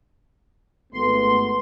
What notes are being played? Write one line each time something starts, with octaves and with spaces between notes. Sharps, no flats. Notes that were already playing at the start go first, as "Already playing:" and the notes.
G#1 A3 B3 C6